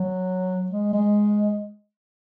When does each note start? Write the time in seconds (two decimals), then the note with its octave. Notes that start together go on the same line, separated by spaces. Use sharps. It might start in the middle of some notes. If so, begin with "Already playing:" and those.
Already playing: F#3
0.71 G#3
0.93 G#3